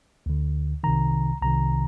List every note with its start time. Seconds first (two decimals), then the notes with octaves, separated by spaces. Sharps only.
0.26 D2 D3
0.84 C2 C3 D#3 A#5
1.42 C2 C3 D#3 A#5